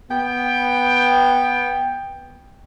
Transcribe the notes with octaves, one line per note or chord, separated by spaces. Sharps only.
B3 G5